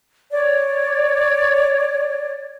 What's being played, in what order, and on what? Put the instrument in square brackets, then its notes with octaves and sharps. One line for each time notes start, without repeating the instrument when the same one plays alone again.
[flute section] C#5 D5